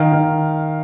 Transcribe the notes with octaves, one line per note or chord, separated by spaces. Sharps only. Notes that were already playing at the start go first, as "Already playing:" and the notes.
Already playing: D#3 F5
D#3